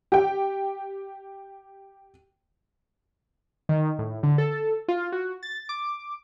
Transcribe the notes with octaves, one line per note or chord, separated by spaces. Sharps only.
G4 G5
D#3
A2
D3
A4
F4
F#4
A6
D6